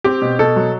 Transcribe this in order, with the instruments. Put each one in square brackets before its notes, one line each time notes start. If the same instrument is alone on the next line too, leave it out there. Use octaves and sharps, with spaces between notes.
[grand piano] C4 [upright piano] G4
[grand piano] B2
[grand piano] B2 [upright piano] A4
[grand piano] F#3